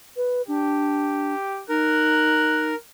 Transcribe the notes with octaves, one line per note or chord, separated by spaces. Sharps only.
B4
D4 G4
D#4 A#4 F#6